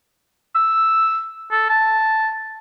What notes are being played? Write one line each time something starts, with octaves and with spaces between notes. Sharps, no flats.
E6
A4
A5